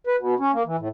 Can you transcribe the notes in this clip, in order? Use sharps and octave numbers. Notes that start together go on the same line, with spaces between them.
B4
B2
C#4
A#3
E3
A2